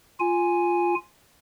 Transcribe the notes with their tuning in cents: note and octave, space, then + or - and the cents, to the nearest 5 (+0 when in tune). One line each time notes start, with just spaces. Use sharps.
F4 +0 G#5 +0